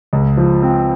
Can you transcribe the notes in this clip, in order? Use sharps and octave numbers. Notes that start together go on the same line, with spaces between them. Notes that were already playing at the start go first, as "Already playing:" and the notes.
C#2
F3
C4